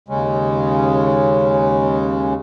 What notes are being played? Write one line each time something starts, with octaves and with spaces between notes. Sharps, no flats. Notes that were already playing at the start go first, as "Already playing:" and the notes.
D#2 C#3 G#3 C#4